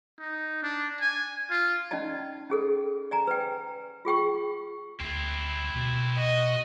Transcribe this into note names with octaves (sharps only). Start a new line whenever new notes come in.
D#4
D4
G#5
F4
C#4 D#4 D5 D#5 A5
C#4 G#4 A4
D5 G#5 A#5
B4 G5
F4 G#4 G5 C#6
D2 C4 E4
B2
F#4 D#5